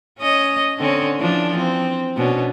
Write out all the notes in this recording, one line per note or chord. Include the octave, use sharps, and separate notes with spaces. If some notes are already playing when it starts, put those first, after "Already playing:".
C#4 D#5
D3 C4 C#4
E3 F3 D4
C4
B2 C#4 D4